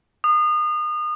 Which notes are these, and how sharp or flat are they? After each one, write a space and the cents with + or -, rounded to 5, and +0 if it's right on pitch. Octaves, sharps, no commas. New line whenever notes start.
D#6 -30